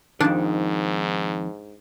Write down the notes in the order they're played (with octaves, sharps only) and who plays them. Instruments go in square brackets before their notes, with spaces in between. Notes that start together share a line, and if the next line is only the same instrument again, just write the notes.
[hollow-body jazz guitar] F2 D#3 [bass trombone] G#2 [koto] D4